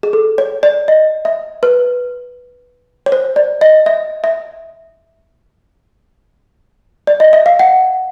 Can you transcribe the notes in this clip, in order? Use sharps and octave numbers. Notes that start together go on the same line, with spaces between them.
G#4
A4
C#5
D5
D#5
E5
B4
C#5
C5
D5
D#5
E5
E5
D5
D#5
E5
F5
F#5